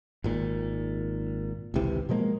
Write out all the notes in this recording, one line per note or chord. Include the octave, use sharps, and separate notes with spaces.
G#1 A#2
G#1 C#2 C3 E3
B2 F3 G#3 A#3